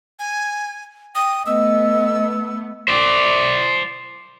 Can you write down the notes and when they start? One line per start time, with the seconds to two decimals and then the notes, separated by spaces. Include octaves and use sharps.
0.19 G#5
1.15 G5 D#6
1.46 A3 B3 D#5 E6
2.88 C5 D5